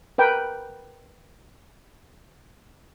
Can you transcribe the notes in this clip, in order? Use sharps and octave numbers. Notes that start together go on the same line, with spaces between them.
A#4 B4 G5